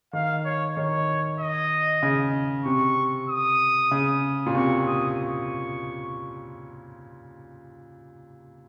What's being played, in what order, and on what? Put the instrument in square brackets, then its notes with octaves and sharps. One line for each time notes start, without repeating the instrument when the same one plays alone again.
[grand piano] D#3 [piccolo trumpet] F5
[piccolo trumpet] C#5
[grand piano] D#3 [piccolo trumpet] C#5
[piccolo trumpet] D#5
[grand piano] C#3
[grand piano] C3 [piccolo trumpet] C#6
[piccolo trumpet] D#6
[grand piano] C#3
A#2
[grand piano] C3 [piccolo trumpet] C#6
[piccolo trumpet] D#6
C#6